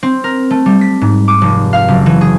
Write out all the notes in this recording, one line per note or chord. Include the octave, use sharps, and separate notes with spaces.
C4
A#4
A3
G3
B6
G#2
D6
F1
F5
F#1
E3
G#4